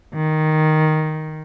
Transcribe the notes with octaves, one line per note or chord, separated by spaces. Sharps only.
D#3